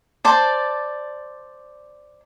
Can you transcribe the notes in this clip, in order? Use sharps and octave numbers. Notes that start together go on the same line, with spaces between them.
C5 D5 A5